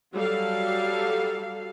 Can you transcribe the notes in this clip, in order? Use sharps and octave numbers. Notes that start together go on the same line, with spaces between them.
F#3 G3 A4 F5